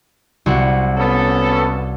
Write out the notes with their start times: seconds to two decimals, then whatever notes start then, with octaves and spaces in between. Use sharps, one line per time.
0.46 C2 F#4 F#5
0.97 B3 C#4 A4